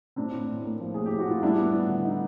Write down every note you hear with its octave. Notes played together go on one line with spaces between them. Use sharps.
A2 C4 D4
A2
A2
A#3
F3
A2 G#4
G4
A2
F#4
A2 F4
G3 D4 E4
B3
B3
D3
D#4